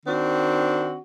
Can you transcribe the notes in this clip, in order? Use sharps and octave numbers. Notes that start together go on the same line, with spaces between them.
D#3 C4 D4 F#4